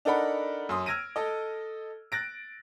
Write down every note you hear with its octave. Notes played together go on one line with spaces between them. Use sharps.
D4 D#4 A4 A#4 F#5 B5
F#2 C6 D#6
E6 F6 G#6 A#6 D7 D#7
A4 D#5
F#6 A6 A#6 D7